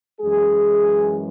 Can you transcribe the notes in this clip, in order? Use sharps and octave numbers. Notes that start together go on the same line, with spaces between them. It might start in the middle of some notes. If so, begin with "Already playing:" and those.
F#2 E3 G#3 G#4